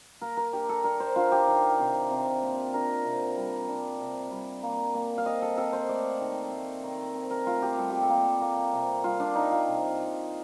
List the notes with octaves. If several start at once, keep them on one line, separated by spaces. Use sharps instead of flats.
A#3 A#4
A#4
D4 G4
A4
D4 A#4
C5
D4 F4
G4
D#3
C3
C3
A#3
D4 A#4
C3
G3
D4
C3
G3
A#3
A#3
F5
C4 D#5
A4
C4 A4
C5
A3 D5
D#3
A3
D#3
C4
A#4
A3 F4
G4
G3 A4
G4
A4
A#3
A#3
C3
G3 F4
D4
A#3 D#4
F4
C3